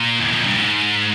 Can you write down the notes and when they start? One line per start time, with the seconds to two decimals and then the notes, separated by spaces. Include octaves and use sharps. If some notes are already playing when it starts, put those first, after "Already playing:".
Already playing: A#2
0.20 E2
0.32 F2
0.45 G2
0.58 G#2